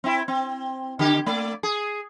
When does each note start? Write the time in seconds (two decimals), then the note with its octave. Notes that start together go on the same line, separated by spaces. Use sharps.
0.04 C4 E4
0.28 C4
0.99 D3 G4
1.26 A3 D5
1.63 G#4